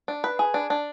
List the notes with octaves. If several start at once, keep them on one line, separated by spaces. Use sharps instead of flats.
D4
B4
G#4
D4
D4